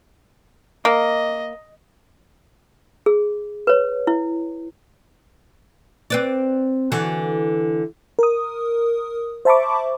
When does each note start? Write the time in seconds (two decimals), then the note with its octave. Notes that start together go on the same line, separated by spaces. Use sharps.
0.85 A#3 D#5
3.06 G#4
3.67 B4 C#5
4.07 E4
6.10 C4 B4 D5
6.92 D3 E3 F#4
8.19 A#4 D#6
9.45 C5 E5 A5 B5 C#6 D6